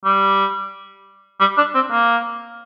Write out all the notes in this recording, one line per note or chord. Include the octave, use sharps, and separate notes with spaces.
G3
G3
D4
C4
A#3